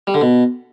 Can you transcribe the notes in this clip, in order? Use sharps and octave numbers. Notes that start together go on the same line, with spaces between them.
G3
D3
B2